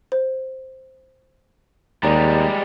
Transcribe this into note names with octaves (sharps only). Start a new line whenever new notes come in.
C5
D#2 G3 G#3 D5 A#5